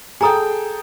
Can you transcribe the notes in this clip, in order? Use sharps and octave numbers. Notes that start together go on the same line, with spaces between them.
G#4 A4 G5 G#5 A#5 D#6